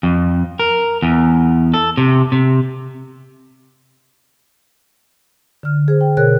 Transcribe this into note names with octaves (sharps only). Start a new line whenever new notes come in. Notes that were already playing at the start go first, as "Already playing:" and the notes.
F2
A#4
E2
A4
C3
C3
D3 F6
G#4 C5
G5
B2 G#4 A#4 C#5 F#6